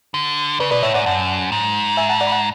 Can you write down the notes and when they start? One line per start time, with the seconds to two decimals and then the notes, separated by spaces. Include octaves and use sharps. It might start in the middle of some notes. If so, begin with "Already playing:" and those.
0.14 D3
0.60 C#3 B4 D5
0.71 B2 B4 D5
0.83 A2 C#5 E5
0.94 G#2 D5 F#5
1.06 F#2 F#5 A5
1.52 G#2
1.97 E5 G#5
2.09 F#5 A5
2.20 D5 F#5
2.27 B5
2.32 F#5 A5